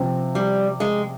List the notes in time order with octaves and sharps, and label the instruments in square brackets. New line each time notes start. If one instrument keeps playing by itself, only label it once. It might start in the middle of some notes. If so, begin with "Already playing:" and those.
Already playing: [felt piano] C3 F3 C4
[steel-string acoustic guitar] G3
G#3